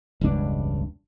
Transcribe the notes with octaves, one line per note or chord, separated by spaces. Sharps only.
E1 C#2 G2 D4